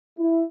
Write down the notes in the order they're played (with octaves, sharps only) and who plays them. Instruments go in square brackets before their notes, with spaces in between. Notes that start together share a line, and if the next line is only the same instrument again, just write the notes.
[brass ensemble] E4